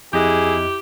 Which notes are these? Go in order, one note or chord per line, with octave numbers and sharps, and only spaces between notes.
F2 E4 G4 G#4 D#5 F#6